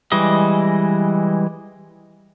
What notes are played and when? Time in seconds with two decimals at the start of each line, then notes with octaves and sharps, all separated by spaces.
0.12 E3 G3 G#3 D#5